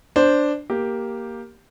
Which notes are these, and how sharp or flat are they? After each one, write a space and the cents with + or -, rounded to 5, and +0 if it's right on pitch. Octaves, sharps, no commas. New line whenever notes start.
D4 +0 C5 +0
A#3 +0 G4 +0